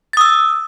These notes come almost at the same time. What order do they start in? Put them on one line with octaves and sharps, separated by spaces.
A6 D#6 E6